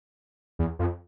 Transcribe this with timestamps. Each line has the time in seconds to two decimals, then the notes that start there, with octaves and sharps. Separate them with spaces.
0.59 E2
0.79 F2